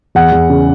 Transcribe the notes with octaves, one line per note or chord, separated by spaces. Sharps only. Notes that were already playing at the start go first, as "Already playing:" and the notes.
E2 F#5
E2
C#3